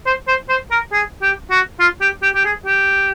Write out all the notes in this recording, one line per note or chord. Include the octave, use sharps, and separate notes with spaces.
C5
C5
C5
A#4
G#4
G4
F#4
F4
G4
G4
G4
G#4
G4